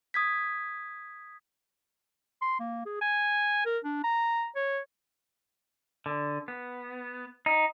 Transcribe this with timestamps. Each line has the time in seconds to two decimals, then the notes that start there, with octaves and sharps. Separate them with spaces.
0.14 D#6 G#6 B6
2.42 C6
2.60 A#3
2.86 G#4
3.01 G#5
3.66 A#4
3.85 D4
4.04 A#5
4.56 C#5
6.06 D3
6.48 B3
7.46 D#4